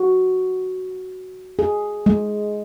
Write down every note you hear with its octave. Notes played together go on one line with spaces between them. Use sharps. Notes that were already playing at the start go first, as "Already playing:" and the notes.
Already playing: F#4
G#4
G#3